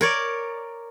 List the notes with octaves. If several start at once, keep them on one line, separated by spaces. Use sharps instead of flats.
A#4 C#5 D5